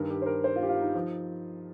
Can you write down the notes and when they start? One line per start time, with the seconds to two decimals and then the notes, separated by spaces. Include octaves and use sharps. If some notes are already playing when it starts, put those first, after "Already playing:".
Already playing: G2 D#3 A#4
0.10 G4
0.22 C5
0.26 A#4
0.44 C5
0.56 F4
0.63 G4
0.69 F4
0.81 D#4
0.95 F3